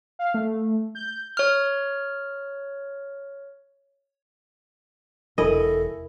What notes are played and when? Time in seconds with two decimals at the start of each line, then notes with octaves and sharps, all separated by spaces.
0.19 F5
0.34 A3
0.95 G6
1.37 C#5 F6
5.38 E1 E4 A4 A#4 D#5 G#5